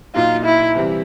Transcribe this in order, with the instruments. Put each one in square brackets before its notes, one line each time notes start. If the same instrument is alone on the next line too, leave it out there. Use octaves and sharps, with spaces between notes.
[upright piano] A#2 F#3 A#3 D#4 [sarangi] F4
[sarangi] E4
[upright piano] C3 E3 G3 C4